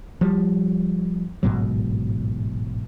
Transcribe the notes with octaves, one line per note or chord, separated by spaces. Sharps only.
F3 G3
A1 G#2 B2 F#3